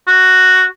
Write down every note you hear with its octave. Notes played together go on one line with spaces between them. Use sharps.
F#4